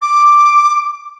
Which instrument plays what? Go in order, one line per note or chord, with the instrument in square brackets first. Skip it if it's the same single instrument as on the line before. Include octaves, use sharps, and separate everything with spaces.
[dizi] D6